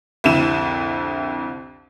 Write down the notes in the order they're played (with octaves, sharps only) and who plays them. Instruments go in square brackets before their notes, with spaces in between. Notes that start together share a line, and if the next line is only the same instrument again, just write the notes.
[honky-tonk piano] C2 F2 D3 E4 E7